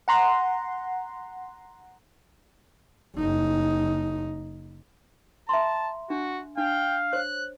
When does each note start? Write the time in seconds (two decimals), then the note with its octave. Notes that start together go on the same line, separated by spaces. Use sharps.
0.08 F#5 A#5 C6
3.16 F#1 D#4
5.49 E5 A5 A#5 C6
6.10 D4 F#4
6.57 D4 F5 G5
7.13 C5 C#5 F#6